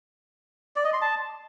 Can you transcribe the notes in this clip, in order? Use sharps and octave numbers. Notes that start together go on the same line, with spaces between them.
D5
D#5
C6
A5